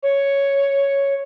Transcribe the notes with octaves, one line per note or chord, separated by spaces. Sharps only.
C#5